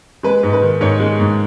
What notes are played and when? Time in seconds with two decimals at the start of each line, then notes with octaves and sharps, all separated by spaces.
0.23 G#3 B4
0.43 G#2
0.53 B4
0.62 D#3
0.81 G#2 C#5
1.00 G#3
1.20 G#2